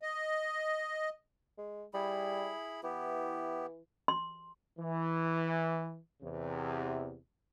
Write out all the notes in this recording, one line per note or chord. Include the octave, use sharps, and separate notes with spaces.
D#5
G#3
G3 E4 G#4 B5
E3 B3 E4 G4
C6
E3
E2 C3